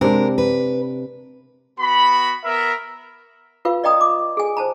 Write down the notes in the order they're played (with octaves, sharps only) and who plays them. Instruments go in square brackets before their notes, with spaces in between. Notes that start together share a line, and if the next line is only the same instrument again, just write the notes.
[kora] C3 D4 [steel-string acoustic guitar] G#3 A#4
[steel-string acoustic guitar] B4
[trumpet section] B3 F#4 B5
B3 A#4 E5
[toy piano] F4 B4 F5
D5 D#5 G5 A#5 D#6
D6
G#4 G#5
C5 A5 A#5